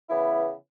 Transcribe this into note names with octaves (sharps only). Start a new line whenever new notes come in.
C#3 E3 B3 E4